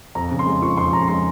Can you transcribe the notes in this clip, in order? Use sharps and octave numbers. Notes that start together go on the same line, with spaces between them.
F2 A#5
C#3
C6
G#3
F3 C#6
F2 C6
C#3 A#5
G#3 C6